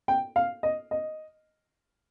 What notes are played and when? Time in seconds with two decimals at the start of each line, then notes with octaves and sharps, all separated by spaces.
0.08 G5
0.36 F5
0.63 D#5
0.91 D#5